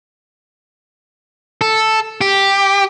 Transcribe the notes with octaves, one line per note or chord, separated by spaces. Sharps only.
A4
G4